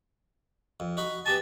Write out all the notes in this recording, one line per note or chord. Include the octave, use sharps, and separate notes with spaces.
F2
D#4 F#4 B5
B3 G4 G#5 A5